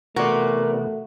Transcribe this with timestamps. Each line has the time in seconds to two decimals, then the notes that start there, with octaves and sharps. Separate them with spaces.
0.16 C3 E3 A3 B3 F#4 A#4 D5